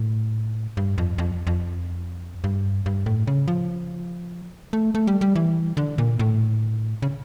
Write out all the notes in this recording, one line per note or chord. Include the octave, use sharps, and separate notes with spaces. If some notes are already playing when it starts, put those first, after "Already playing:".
Already playing: A2
G2
F2
F2
F2
G2
G2
A2
C#3
F3
A3
A3
G3
G3
E3
D3
A#2
A2
C#3